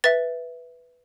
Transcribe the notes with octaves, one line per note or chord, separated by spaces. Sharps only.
B4 E5 A6